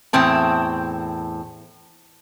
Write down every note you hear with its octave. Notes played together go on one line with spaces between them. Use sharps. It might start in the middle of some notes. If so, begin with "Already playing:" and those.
E2 A2 C4 A5